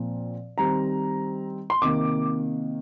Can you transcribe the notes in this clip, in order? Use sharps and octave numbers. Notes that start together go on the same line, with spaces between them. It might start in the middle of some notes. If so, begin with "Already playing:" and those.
Already playing: A#2 F3 C4
D#3 G3 C4 A#5
C6
C3 D#3 A#3 D6